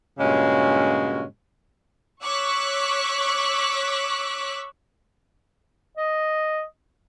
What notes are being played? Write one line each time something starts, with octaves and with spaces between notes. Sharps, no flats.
G2 A#2 C#3 G#3 C#4 F#4
C#5 C#6 D6 E6 F#6 B6
D#5